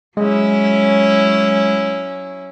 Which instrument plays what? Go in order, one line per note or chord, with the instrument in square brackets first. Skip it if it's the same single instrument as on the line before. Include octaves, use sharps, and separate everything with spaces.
[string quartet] F#3 C#4 E4 [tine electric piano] G#3